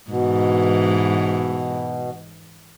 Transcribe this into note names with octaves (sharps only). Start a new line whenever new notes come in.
G#2 B2 E3